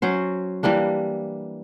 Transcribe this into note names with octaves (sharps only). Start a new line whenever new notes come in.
F#3 C#4 C5
E3 G3 A#3 D4